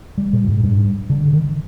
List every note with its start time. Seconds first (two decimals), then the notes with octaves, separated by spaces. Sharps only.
0.18 G3
0.33 A#2
0.48 G#2
0.63 G2
1.10 D3
1.33 D#3